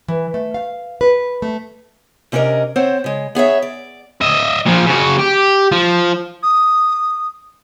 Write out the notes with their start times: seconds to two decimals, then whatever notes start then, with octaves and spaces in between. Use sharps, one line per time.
0.08 E3
0.34 A3
0.54 F5
1.01 B4
1.42 A3
2.32 C3 C#4 D4 G4 A#4 D#5
2.76 C4 C5 C#5 F#5
3.04 C#3 G#3
3.35 B3 G#4 C#5 E5
3.62 D5
4.21 D#5 E5
4.66 A#2 F3
4.87 C#3 F#4
5.19 G4
5.72 F3
6.42 D#6